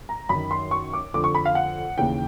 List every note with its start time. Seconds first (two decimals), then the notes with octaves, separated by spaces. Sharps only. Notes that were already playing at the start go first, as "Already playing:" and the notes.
0.09 A#5
0.29 F#2 B5
0.35 D#3
0.51 C6
0.71 C#6
0.93 D6
1.14 F2 D3 D6
1.24 C#6
1.35 B5
1.45 F5
1.55 F#5
1.98 D#2 C#3 E3 G5